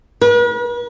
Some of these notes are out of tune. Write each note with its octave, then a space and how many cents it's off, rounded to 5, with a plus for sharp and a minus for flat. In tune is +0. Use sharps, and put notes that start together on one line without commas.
B4 -45